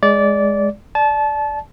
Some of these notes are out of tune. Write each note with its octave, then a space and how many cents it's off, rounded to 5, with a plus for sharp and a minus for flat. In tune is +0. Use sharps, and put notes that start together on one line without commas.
G#3 +0 D5 -20
D5 +0 A5 -25